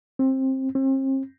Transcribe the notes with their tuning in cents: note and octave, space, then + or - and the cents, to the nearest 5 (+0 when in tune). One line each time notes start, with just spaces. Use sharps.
C4 +20
C4 +40